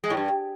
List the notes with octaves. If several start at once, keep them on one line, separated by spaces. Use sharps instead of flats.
G#3
A2
G2